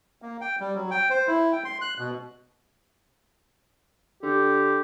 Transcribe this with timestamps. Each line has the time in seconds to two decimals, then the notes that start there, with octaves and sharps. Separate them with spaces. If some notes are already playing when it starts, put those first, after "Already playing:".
0.22 A#3
0.41 G5
0.60 G3
0.75 F#3
0.91 G5
1.10 C5
1.28 E4
1.53 G5
1.65 C6
1.81 F#6
1.98 B2
4.23 D3 G4